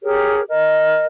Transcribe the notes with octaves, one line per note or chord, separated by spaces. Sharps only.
G4 G#4 A#4 C#5
A#4 D#5